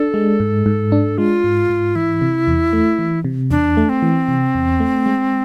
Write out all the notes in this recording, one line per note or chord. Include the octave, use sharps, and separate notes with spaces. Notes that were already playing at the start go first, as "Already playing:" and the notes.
Already playing: D4 A4
G#3
G#2
G#2
D4
G#3 F4
G#2
G#2
E3 E4
C3
E2
A3
E3
C3
E2 D4
A3
C4
E3
C3
E2
A3
G#3